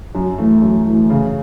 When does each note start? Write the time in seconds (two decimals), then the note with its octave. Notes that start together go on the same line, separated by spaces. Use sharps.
0.15 F#2
0.38 E3 A3
0.62 F#2
0.86 E3 A3
1.10 C#3